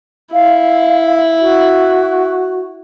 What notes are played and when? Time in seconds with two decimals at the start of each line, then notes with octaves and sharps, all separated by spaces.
0.33 E4 F5
1.41 F#4